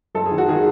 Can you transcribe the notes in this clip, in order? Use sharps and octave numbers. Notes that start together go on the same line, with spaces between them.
F#1 A4
G#4
D#3
F#4
D#3 G#4